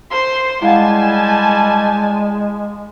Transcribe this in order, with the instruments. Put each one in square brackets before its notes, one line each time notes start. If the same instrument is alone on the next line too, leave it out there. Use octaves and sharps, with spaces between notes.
[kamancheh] C5 C6
[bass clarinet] G3 [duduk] G#3 [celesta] E4 F5 F#5 [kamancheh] G#5 A5